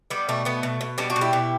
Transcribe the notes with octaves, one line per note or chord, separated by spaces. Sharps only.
G3 B3
B2 A3
A3 B3
B2
B2
G3 B3 D4
D4 F#4
B2
E4 G4
B2